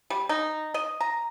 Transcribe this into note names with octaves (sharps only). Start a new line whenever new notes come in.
G3
D#4
D#5
A#5